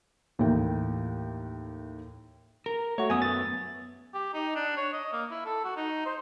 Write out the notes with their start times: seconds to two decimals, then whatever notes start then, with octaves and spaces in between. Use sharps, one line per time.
0.39 D#2 A2 E3 A#4 G5
2.66 A#4
2.98 A3 F#4 C#5
3.10 F#2 A3 B3 G#5 D#6
3.22 A6
4.14 G4
4.34 D#4
4.55 D4
4.77 C#5
4.93 D#5
5.13 A#3
5.31 E4
5.46 A4
5.64 F#4
5.76 D#4
6.06 C5